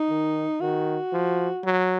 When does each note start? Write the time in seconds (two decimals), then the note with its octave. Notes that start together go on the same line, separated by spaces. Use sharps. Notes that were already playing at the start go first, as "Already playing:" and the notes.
Already playing: D#4
0.10 D#3
0.61 D#3 F#4
1.13 F3
1.64 F#3